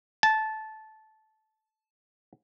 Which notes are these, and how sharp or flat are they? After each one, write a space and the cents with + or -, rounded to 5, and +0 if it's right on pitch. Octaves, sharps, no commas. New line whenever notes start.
A5 -15